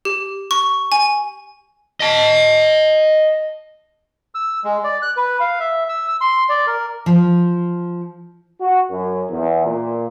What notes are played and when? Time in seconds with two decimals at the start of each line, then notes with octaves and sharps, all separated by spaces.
0.05 G4
0.51 C#6
0.92 G#5
2.00 D#5 A5
4.35 E6
4.64 G#3
4.84 D5
5.02 F#6
5.17 B4
5.40 F5
5.60 E5
5.89 E6
6.08 E6
6.21 C6
6.49 D5
6.67 A#4
7.06 F3
8.61 F#4
8.89 F#2
9.31 E2
9.65 A#2